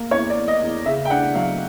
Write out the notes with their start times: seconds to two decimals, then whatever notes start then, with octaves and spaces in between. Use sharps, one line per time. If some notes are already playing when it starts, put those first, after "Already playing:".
Already playing: A#3
0.11 E2 C#5
0.30 D5
0.36 E2
0.48 D#5
0.61 E2
0.85 C#3 E5
1.05 G5
1.10 D4 F#5
1.35 F#3 F5